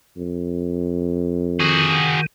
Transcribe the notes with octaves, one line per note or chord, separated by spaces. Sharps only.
F2
D#3 F#4 G#4